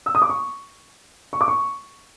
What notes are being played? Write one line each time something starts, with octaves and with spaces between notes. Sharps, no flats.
E6
D#6
D6
C#6
C#6
D6
C#6